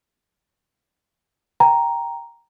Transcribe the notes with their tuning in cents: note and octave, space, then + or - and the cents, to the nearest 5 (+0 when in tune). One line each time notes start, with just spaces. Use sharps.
G5 +0 A#5 +0